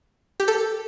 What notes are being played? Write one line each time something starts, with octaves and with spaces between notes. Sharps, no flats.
G4
A4